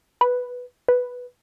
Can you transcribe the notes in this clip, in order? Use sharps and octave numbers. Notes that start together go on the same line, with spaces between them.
B4
B4